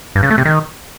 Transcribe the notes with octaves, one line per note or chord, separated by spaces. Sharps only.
G2
C#3
A3
C3
D#3